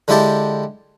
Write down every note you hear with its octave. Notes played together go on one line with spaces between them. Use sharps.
D3 G#3 E4 G4 A5